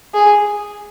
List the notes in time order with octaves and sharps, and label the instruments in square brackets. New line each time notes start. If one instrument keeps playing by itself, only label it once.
[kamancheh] G#4